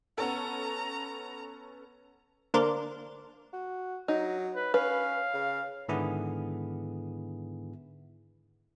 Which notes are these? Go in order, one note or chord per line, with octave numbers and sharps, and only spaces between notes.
B3 C#4 A4 A#5
D3 A#3 A#4 C5 D5
F#4
F#3 D#4
B4
C#4 B4 F5
C#3
G#2 D3 D#3 B3 E4 G#4